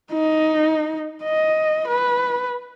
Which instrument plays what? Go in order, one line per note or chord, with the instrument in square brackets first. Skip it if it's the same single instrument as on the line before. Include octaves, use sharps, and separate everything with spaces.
[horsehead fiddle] D#4
D#5
B4